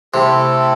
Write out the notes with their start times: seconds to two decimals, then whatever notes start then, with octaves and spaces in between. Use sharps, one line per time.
0.13 C3 A3 C4 E4 A4